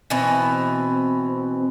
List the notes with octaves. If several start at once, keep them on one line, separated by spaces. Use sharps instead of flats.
B2 E3 C4